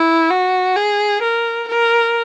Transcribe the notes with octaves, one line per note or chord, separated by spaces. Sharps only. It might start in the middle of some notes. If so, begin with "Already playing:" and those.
Already playing: E4
F#4
G#4
A#4
A#4